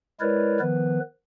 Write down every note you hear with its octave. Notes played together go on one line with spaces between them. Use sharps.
G#3 E4 A#4 B4 C#5 D5
D#3 F3 B3 B4